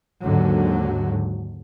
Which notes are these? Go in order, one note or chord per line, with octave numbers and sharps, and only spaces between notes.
D#2 G#2 D3 F#3